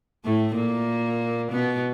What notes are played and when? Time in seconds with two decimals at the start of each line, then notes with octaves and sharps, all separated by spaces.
0.25 A2 A3
0.56 A#2 A#3
1.52 B2 B3